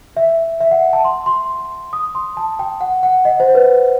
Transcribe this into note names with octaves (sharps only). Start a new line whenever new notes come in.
E5
E5
F#5
A5
C6
C6
D#6
C6
A5
G5
F#5
F#5
D#5
C5
B4